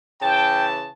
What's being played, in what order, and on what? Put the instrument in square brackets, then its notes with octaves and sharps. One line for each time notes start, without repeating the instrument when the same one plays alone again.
[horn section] C#3 E3 A5 [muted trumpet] G5